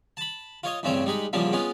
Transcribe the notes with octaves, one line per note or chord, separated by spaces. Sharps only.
A5 B5
F4 C#5 D#5
A1 G2 C#3 C4 C#4 C#5
G3 G#3 D#4 B5
E2 A#2 C#3 F3 G3 A#3
G#3 B3 C#4 F4